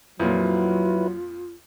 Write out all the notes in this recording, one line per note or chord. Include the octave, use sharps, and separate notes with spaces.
F2 A#2 F#3 E4 F4 B4